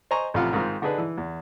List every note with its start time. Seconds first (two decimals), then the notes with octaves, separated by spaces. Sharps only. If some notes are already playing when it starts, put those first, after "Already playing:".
0.11 C5 D#5 G#5 A#5 C#6
0.34 A1 C3 F3 F4 F5 F#5
0.53 G#2 D#3 C4 F4 F6
0.82 D3 D4 D#4 G#4 B4
0.98 E3
1.18 E2